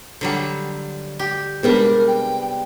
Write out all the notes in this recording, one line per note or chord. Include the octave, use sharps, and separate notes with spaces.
D3 F#3 G3
G4
C3 G3 G#3 B3 D4 A#4
G5